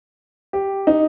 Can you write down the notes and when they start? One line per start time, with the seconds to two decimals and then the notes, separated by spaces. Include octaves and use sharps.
0.53 G4
0.87 D#4